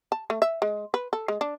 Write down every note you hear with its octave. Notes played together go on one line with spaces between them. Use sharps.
A5
A3
E5
G#3
B4
A4
G#3
D4